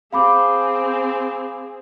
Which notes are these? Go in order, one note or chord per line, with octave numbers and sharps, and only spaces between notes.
C4 G#4 F5 B5 D6